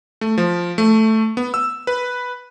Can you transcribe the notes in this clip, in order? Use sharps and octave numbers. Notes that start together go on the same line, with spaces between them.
A3
F3
A3
B3
E6
B4